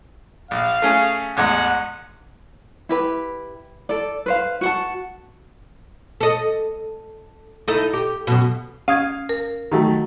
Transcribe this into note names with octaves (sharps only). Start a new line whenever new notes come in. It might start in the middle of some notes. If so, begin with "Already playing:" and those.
A#1 F5
A3 C#4 G#4
A1 E2 G#3 F#5
E4 G4 B4
A4 D5
B4 C5 F5
F#4 F#5 A5
A4 D#5
D#4 E4 A4
G4
F#2 B2
C#4 F5 D#6 G#6
A#4
D#3 F#3 A3